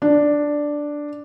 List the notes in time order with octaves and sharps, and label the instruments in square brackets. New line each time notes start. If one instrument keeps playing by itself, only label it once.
[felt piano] D4